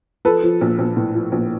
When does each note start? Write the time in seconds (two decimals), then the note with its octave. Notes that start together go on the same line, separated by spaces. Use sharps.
0.25 F3 A4 B4
0.43 F3
0.61 A#1
0.79 A#1
0.97 A2
1.14 F3
1.32 A#1